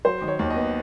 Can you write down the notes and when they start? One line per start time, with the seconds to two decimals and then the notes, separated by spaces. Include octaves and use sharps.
0.05 F#3 C5
0.22 D#3
0.28 C#5
0.39 D#2
0.50 D#5
0.56 B3